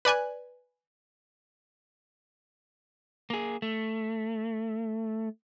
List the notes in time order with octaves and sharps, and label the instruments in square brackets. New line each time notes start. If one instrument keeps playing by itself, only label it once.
[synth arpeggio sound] B4 D5 G#5 F#6
[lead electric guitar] A#3 G#4
A3